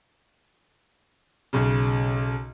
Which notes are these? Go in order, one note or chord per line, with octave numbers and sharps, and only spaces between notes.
B1 C#3